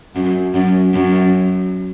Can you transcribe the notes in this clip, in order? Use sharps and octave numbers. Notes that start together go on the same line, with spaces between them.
F#2
F#2
F#2